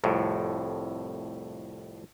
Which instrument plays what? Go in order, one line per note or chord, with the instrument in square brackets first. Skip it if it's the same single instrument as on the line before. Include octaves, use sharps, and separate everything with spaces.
[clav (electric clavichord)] C2 F2 A2